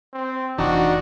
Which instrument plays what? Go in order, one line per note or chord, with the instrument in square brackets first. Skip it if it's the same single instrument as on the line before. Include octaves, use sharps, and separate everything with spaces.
[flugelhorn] C4
[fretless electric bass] F1 E3 [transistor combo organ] D4 D#4 [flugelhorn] F#4